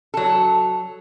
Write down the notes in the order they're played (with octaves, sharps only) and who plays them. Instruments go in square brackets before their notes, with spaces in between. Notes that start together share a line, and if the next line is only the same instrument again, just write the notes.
[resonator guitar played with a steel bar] F#3 A4